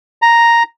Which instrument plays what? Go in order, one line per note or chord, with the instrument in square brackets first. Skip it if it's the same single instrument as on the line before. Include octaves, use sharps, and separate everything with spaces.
[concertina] A#5